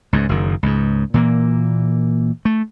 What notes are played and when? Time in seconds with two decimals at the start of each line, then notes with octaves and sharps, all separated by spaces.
0.13 C#2 G#2
0.29 F#1 F#2 D#3
0.63 C#2 G#2
1.14 A#2 E3 A#3
2.45 A3